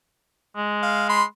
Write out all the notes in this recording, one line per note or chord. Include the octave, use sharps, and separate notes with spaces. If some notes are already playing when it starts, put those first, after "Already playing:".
G#3
F5
B5 C6